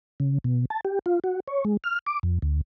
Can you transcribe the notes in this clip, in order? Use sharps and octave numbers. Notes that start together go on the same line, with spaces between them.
C#3
B2
A5
G4
F4
F#4
C#5
G#3
F6
D6
F2
D2